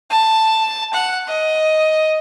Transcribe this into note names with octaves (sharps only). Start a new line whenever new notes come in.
A5
F#5
D#5